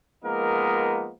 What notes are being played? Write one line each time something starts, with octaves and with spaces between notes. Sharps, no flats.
F3 G#3 A#3 B3 D#4 A#4